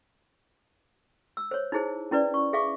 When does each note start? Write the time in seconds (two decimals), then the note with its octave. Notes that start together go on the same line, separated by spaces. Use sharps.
1.37 E6
1.51 C5 C#5
1.72 D#4 E4 G#4 C5
2.11 C#4 E4 B4 D5
2.34 C#6
2.53 G#4 E5 F5 C#6 D6